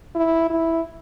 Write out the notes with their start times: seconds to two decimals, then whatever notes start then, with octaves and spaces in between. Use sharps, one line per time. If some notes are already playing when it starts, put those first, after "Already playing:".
0.15 E4
0.50 E4